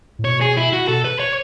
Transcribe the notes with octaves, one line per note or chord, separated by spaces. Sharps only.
A2
B2 C#5
G#4
E4
F#4
B2 A4
B4
C#5